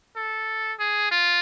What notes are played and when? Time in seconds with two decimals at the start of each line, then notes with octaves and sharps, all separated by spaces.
0.16 A4
0.79 G#4
1.11 F4